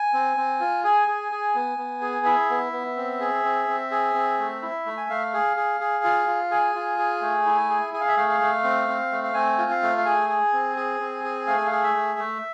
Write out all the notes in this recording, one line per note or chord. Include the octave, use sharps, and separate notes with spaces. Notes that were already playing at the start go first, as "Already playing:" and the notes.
Already playing: G#5
C4
C4
F4
G#4 G#5
G#4
G#4
B3
B3
G#4
E4 E5
B3
B3
C4
G#4
C4
C4
G#4
C4
A3
E4
A3
G#5
A3 F5
G#4
G#4
G#4
F4
F4
G#4 G#5
F4
G#4
A3
E4
G#4
G#4 G#5
F5
E5
A3 F5
F5
A3
C4
C4
A3
F5
C4 G#5
F4
F5
A3
F5
G#4 G#5
G#4
C4
G#4
C4
G#4
A3 F5
G#5
F5
G#4
E5
A3
A3